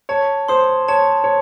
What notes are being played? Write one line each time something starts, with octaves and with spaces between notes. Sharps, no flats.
C#5 A5
C5 C6 D#6
C#5 A5
C#5